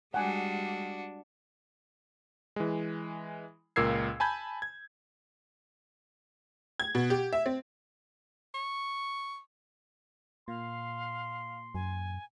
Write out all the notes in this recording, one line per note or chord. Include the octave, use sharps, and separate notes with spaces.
G3 G#3 D4 F#4 F#5 G#5
E3 G#3
C#2 A#2 A#4 E6 G#6 C7
G#5 A5 B5 G6 G#6
G#6
G#6
B2
G4
E5
C4
C#6
A#2 F5 C6
F#2 G#5